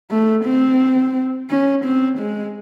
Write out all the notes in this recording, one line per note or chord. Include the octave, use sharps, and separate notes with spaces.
A3
C4
C#4
C4
G#3